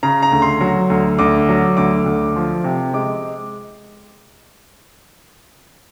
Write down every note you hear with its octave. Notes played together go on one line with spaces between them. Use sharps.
C#3 A#5
A#5
D2
C6
F#3
D2
D2 D6
F#3
D2 D6
D2
F3
C3
G#3 D6